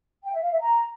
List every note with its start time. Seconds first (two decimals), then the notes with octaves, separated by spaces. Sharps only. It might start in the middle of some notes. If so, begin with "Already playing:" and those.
0.23 G5
0.32 E5
0.41 F5
0.51 E5
0.60 A#5